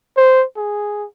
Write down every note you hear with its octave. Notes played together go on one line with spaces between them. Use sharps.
C5
G#4